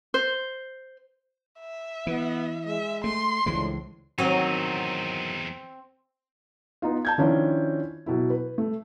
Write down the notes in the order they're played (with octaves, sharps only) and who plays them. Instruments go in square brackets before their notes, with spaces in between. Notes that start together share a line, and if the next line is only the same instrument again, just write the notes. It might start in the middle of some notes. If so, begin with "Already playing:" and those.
[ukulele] C5
[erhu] E5
[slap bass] E3 [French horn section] B3
[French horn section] G#3 [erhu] E5
[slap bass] A3 [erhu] C6
[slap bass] C#2 E3 G#3 [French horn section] A2 F3 D4
[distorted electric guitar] E2 D#4 [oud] D#3 F#3 [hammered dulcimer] C4
[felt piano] B3 D#4 F4
A5 G6 G#6
D#3 F3 C#4 D4 E4 F4
B2 F#3 E4
B4
A3